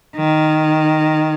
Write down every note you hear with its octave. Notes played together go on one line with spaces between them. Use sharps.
D#3